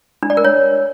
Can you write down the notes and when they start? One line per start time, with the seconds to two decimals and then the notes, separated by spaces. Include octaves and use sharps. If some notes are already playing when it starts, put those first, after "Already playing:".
0.23 D4
0.30 D5
0.37 A#4
0.45 C#5